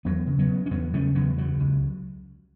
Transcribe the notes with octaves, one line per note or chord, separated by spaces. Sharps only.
E2 F#3 B3
C#3
F#3 B3
C#3
C#4
E2 F#3 B3
C#3 A3 C#4
E2 F#3 B3
C#3 F#3
C#2